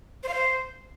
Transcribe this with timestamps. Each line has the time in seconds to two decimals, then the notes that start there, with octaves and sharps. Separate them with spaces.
0.23 C5
0.29 F5
0.34 C5